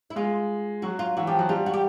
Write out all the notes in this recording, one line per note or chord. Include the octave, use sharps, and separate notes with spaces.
E4
G#3 F4
F#3 F#4
F4
E3 F#4
F3 G4
F#3 F#4
G3 F4
F#4
G4